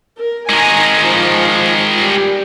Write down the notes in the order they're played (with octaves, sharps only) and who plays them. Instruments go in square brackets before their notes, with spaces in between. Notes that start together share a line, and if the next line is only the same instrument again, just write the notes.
[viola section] A#4
[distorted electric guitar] D#3 G#3 [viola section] G#5 A#5
[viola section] F3
G3 G4